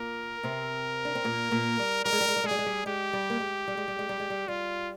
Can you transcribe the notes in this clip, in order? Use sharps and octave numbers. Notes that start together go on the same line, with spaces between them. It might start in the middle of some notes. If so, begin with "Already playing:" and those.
Already playing: A#2 A#3 A#4
C3 C4
D4
C4
A#2 A#3
A#2 A#3
G3
G3 A#4
G#3
G3
G#3
G3
G#3
G3 G#4
G#3
G3
G#3 G4
G3
A#3
G#3
G3
G#3
G3
G#3
G3
G#3
G3
G3 F4